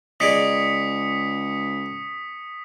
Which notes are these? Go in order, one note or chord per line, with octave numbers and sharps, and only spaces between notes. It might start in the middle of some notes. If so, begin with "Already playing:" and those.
C#2 G#4 D5 D#5 D#6 B6 C#7